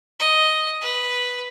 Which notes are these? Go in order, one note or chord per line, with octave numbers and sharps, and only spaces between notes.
D#5
B4